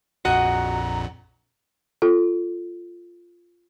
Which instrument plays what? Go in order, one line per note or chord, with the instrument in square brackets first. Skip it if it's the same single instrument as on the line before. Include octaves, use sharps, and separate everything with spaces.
[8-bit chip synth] A#1 F2 A#2 [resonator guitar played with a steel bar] F#4 D#5 [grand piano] F#5 [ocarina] A#5
[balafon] F4 A4